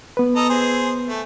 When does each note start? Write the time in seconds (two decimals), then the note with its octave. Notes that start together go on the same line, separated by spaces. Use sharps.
0.17 B3 B4
0.36 A4 D#5 A#5
0.50 G#4 C5
1.09 A3